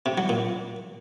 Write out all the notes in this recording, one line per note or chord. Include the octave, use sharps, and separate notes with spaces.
C3
F#3
A#2